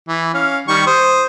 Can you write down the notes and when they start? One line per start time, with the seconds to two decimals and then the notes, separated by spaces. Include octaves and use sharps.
0.08 E3
0.34 C#4 F5
0.68 D#3 G3 C#6
0.86 C5 D#6